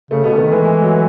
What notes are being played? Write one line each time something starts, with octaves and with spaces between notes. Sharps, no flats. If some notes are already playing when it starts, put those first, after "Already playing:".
C#3 A3
B2 B3
D#3 B3
E3 G#3
G#3
F#3